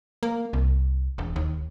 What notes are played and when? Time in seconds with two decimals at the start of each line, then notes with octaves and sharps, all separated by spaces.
0.23 A#3
0.53 C2
1.18 E1
1.36 D#2